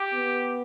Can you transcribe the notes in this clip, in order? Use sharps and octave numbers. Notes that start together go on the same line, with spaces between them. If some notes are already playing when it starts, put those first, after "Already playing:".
Already playing: G4
B3